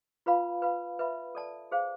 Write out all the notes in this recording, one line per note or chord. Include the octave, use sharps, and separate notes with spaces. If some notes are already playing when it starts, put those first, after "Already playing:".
F4 B4 F5 B5
B4 F5 B5
B4 E5 B5
A4 D5 A5
G#4 C5 F5